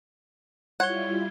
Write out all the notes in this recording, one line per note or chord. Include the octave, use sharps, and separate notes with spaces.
G3 E4 F4 C#5 F#5 G#6 G7